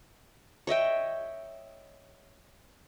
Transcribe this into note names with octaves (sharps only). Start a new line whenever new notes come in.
C#5 D#5 E5 G5